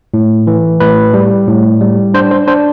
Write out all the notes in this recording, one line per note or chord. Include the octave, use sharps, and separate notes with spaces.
A2
E3
A2 B4
G3
A2
G3
D4 C5
C5
D4 C5